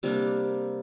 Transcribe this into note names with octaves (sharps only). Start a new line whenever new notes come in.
C3 G3 A#3 D4